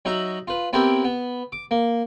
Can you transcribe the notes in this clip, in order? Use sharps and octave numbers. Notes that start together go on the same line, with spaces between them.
F#3 D#4 F#4 E5 A#5
F4 B4
B3 C4 E4 G4 A#4
B3
D6
A#3